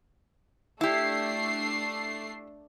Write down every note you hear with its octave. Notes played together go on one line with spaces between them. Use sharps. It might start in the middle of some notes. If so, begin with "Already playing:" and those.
A3 D4 E4 G4 C7